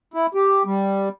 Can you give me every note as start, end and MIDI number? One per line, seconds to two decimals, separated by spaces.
0.14 0.26 64
0.35 0.63 67
0.65 1.09 55